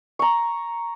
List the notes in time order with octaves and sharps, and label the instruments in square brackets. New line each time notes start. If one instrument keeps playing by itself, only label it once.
[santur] A#5 C#6